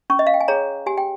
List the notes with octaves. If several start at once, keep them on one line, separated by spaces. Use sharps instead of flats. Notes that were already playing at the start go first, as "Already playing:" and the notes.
C#4 C#6
D#5
F5
G5
G#5
G#4 C#5 A#5
G4 G#5
G5